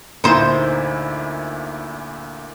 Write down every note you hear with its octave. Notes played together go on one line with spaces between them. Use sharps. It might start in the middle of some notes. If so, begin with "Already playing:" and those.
D2 A#2 D#4 E4 C5